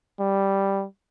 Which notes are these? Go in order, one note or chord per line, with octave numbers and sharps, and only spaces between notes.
G3